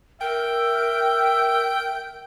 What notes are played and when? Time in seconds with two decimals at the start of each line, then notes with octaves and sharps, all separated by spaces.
0.21 A#4 E5 G5